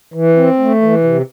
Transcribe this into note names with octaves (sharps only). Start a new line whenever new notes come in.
E3
C4
A3
E3
C3